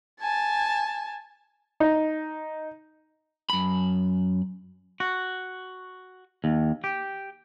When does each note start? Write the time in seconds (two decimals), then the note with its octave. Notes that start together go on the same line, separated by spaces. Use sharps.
0.20 G#5 A5
1.80 D#4
3.50 F#2 B5
5.00 F#4
6.44 D#2
6.84 G4